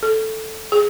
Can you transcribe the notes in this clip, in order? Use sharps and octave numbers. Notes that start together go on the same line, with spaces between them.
A4
G#4